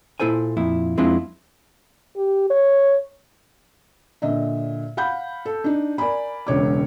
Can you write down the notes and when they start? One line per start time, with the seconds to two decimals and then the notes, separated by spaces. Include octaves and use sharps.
0.20 A#2 E4 A4 C5 G#5
0.57 F2 A#2 E4
0.98 F2 G#3 C4 D4 E4 F4
2.17 G4
2.50 C#5
4.22 A#2 D3 D#5 E5
4.97 F5 F#5 B5 G6
5.45 A4
5.64 D4 D#4
5.98 A#4 D5 G#5 B5
6.47 E1 C#2 C#5 D6